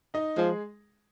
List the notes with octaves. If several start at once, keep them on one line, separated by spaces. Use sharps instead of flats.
D#4 D#5
F3 G#3 G#4